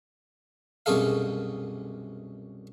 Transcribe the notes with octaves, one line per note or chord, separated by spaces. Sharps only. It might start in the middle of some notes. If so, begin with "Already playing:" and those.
C2 F#2 B2 G#4 A4 F5